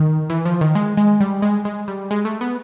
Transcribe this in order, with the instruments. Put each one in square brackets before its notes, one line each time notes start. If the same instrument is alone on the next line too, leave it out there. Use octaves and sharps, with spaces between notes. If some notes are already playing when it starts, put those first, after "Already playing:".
Already playing: [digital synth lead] D#3
E3
F3
D#3
G#3
G#3
G3
G#3
G#3
G3
G#3
A3
B3